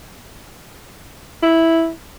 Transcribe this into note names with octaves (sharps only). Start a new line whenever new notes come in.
E4